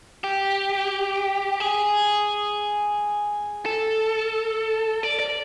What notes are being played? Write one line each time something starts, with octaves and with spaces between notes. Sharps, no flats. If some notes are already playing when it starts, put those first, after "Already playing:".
G4
G#4
A4
D5
D5